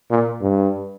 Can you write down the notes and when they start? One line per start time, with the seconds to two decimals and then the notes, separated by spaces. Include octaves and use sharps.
0.10 A#2
0.41 G2